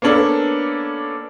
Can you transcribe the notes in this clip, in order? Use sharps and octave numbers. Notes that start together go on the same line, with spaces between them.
A#3 B3 C#4 D4 A4